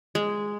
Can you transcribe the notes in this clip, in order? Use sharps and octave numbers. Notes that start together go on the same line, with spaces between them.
G#3